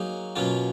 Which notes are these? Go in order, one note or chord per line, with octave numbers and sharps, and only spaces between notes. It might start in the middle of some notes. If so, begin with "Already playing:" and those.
Already playing: F#3 A#3 D#4 G#4
B2 F#3 A#3 C#4 F4